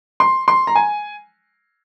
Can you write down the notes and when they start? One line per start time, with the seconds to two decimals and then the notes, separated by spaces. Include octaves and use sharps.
0.20 C6
0.48 C6
0.67 A#5
0.75 G#5